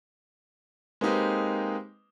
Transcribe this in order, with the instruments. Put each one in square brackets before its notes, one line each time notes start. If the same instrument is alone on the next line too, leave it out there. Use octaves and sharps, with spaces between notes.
[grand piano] G#3 A#3 C4 D#4 G4 B4